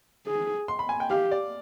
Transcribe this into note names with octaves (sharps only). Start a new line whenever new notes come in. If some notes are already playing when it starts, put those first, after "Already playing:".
G#4
C6
B5
G#5
G5
G4 F5
D5